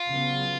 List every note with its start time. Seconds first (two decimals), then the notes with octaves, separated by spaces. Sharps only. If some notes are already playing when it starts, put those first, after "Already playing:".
Already playing: F4
0.13 C#3 F#3 B3